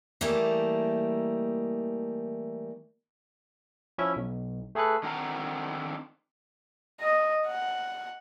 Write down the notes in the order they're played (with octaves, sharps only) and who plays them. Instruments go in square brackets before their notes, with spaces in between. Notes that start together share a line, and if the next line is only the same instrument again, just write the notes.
[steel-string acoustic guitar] E3 G3 A3 A#3 D#4
[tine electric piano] F3 C#4 E4 E5
B1
A3 G#4 A4 B4 F#6
[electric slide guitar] D3 D#3 C4 F#5 A#5
[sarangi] D#5
F#5